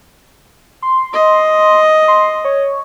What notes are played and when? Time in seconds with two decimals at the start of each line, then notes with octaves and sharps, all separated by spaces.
0.82 C6
1.13 D#5
2.08 C6
2.45 C#5